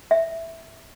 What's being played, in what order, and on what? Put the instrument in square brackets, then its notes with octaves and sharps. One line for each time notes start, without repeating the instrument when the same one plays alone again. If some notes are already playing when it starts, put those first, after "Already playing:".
[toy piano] E5